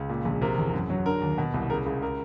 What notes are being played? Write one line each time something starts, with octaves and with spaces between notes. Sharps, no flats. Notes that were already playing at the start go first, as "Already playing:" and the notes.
Already playing: C#2
A#2
A#1
C3 A#4
E2
F#2
F#3
D3 A#4
D#2
B2
C2
C#3 A#4
C#2 G#4
C#3 A#4